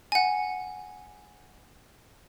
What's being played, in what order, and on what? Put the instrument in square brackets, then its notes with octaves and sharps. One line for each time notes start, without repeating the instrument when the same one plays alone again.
[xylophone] F#5 G#5